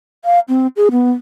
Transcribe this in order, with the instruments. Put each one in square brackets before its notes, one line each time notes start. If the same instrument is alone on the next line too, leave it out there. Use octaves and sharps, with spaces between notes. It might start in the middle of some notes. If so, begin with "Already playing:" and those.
[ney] F5
C4
G#4
B3